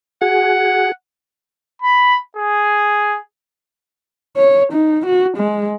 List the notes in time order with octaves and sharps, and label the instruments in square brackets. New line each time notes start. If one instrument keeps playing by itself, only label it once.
[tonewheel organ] F#4 G#4 [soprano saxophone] F#5
[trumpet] B5
G#4
[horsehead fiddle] C#5
D#4
F#4
G#3